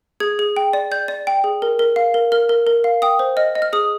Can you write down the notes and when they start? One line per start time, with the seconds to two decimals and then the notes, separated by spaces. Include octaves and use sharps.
0.20 G#4 G#6
0.39 G#4
0.56 G5
0.73 D5
0.91 D5 G6
1.08 D5
1.27 G5
1.44 G#4
1.62 A#4
1.79 A#4
1.96 F5
2.14 A#4
2.32 A#4 F6
2.49 A#4
2.67 A#4
2.84 F5
3.02 G5 D#6
3.19 C5
3.37 D#5 F6
3.55 D#5
3.62 F6
3.73 G#4 D#6